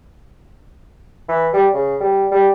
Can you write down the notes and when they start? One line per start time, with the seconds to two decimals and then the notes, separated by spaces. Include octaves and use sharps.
1.29 E3
1.53 G3
1.74 C#3
2.01 G3
2.31 G3